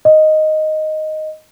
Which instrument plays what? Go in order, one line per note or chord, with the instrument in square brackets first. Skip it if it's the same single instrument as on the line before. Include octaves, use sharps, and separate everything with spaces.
[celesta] D#5